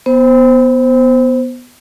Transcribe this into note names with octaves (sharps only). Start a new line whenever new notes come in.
B3 C5